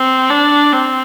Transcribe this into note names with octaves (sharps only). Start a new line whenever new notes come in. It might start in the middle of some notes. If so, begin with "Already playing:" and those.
Already playing: C4
D4
C4